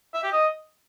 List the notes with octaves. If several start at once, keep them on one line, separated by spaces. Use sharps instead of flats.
E5
G4
D#5